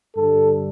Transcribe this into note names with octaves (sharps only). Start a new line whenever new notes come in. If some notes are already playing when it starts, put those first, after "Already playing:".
G2 D3 G3 A4